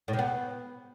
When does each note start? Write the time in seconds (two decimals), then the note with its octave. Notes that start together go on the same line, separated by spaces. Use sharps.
0.08 A2
0.13 C3
0.19 B3